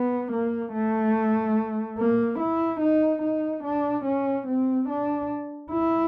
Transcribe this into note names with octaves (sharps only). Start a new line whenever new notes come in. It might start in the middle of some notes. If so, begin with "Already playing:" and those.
Already playing: B3
A#3
A3
A#3
E4
D#4
D#4
D4
C#4
C4
D4
E4